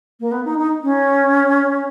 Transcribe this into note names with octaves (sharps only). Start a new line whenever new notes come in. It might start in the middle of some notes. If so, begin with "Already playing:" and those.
A#3
B3
D#4
D#4
C#4